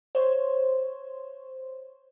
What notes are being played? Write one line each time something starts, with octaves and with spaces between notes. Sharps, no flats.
C5 C#5